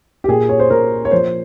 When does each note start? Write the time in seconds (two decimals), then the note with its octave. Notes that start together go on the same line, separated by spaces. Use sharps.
0.24 G4
0.28 A#2 G#4
0.49 C#5
0.60 C5
0.70 A#2 A#4
1.05 C#5
1.11 F3 C5